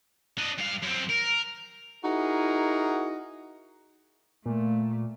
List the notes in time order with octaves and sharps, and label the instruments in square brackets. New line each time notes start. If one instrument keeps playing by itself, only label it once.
[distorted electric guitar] D4 D#5
G2 F5
F#2 C4
A#4
[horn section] D#4 E4 F#4 G#4 A#4
[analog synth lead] A#2 [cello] A3